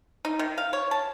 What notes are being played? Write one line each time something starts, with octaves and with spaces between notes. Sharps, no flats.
D#4
D#3
F5
C#5
A5